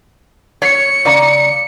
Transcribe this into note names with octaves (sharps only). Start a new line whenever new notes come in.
C#5 C#7
C#3 D5 A#5